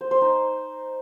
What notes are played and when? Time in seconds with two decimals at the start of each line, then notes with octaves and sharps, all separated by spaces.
0.01 C5
0.11 C5
0.21 D#4